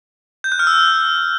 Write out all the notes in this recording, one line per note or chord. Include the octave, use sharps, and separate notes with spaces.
G6
F#6
F6
E6